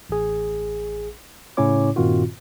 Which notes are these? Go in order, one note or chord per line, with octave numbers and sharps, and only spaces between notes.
A1 G#4
A2 C#3 C#4 E4 C#5 D6
G2 A#2 D#3 C4 F4 F#4